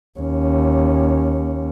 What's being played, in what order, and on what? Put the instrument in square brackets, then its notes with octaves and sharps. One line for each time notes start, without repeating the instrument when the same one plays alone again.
[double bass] D#2 C#4